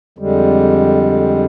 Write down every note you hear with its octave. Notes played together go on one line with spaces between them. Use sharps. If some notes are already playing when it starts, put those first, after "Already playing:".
F2 D3 G3 G#3